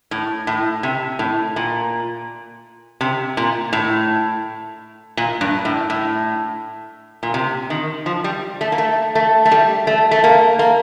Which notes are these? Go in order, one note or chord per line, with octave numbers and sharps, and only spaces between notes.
A2
A2
C3
A2
A#2
C3
A#2
A2
A#2
G2
A2
A2
A#2
C3
D#3
F3
G3
A3
A#3
A3
A3
A3
G3
A3
A3
A#3
A#3